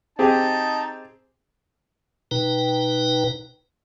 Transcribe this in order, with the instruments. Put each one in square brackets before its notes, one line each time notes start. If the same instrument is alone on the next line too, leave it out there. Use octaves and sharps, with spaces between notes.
[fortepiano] C4 G4 G#4 [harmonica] D#4 A5
[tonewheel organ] B2 D#4 B4 G5 A#5